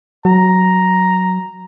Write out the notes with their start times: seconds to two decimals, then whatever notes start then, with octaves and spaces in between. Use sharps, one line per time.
0.25 F#3 A#5